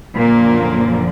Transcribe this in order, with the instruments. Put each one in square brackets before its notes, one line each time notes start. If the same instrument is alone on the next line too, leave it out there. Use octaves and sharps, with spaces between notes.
[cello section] F#2 A#2 D3 F3 A#3